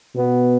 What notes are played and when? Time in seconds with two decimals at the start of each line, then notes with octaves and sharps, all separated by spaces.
0.14 B2 B3